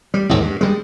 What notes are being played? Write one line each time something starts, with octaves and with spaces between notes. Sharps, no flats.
G3
A1 D#2 G#2
G2
G3 G#3